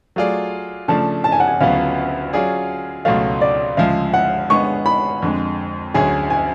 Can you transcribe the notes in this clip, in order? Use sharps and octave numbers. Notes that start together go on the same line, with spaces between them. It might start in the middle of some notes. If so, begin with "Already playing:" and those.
F#3 A3 F4 G#4 D5
C#3 F3 A3 D4 A5
A5
G#5
F#5
G#5
D2 C#3 F#3 B3 F4 F5
F#3 C#4 F4 G#4 D5
C#2 B2 F#3 A3 F5
D5
D2 C#3 F3 G#3 F5
F#5
D3 G#3 B3 C#6
B5
F2 D3 G#3
D2 D3 F#3 C#4 G#4 G#5
G#5